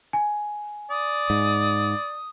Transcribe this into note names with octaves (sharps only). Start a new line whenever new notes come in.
G#5
D5 D#6
G#2